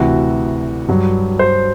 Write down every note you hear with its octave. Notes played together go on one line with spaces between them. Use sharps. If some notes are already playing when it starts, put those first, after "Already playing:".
Already playing: D2 C3 E3 F#4
G2 F#3
C5